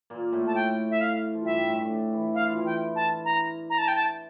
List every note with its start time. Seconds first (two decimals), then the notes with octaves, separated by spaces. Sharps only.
0.10 A#2 A#3
0.33 A2 A3
0.47 A5
0.55 G5
0.91 E5
1.01 F5
1.35 F3
1.45 G2 G3 E5
1.68 A2 A3
1.90 D3 D4
2.13 E3 E4
2.35 E4 F5
2.46 F4
2.57 E3 E4
2.66 G5
2.96 A5
3.25 A#5
3.70 A#5
3.78 A5
3.88 G5
3.95 A5